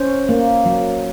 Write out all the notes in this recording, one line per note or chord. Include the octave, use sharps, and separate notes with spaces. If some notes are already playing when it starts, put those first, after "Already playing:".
Already playing: C#4 C5
A#3
F#3